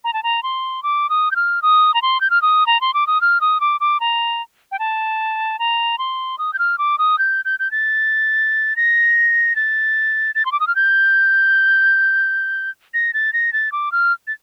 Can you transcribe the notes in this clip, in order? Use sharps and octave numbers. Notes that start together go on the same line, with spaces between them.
A#5
A5
A#5
C6
D6
D#6
G6
F6
D#6
A#5
C6
G6
F6
D#6
A#5
C6
D6
D#6
F6
D#6
D6
D6
A#5
G5
A5
A#5
C6
D#6
G6
F6
D6
D#6
G6
G6
G6
A6
A#6
A6
A6
C6
D6
D#6
F6
G6
A#6
A6
A#6
A6
D6
F6
A6